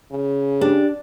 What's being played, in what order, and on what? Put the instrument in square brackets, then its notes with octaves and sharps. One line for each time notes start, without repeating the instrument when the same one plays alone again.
[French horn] C#3
[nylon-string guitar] D4 [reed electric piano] G4